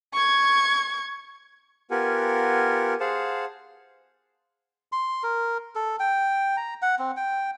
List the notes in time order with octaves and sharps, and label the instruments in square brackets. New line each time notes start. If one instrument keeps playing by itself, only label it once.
[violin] C#6 G#6
[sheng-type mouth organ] B3 F4 G4 A#4 F#5 G#5
G#4 C5 F5 F#5 A5
[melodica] C6
A#4
A4
G5
A#5
F#5
C4
G5